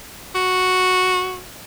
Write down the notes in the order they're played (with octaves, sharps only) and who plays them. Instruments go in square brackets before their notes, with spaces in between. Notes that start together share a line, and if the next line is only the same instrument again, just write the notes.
[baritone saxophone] F#4